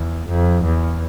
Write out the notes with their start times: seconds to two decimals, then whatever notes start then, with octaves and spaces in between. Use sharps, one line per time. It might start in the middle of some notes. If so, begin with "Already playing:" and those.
Already playing: E2
0.29 F2
0.64 E2